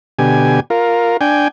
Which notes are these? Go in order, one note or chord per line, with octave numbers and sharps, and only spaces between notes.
B2 D3 G4 G#5
F4 A#4
D4 G5 G#5